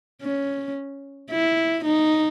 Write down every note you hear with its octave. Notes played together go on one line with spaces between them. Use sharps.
C#4
E4
D#4